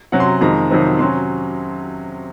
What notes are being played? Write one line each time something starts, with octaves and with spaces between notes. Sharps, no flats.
C3 F#3 C#4 F#5
C6
A#5
F2 D#3 G#3 A#5
F2 C3 D#3 F#3 C4
C3 F#3 C#4 C6